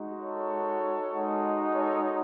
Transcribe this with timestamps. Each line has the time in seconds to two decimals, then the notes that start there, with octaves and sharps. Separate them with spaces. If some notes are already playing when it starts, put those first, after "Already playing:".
Already playing: G#3 D#4 F#4
0.19 A4 C#5
1.12 G#3 D#4 F#4
1.73 A4 C#5